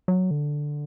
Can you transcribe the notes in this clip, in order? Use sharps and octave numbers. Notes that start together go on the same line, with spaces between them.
F#3
D3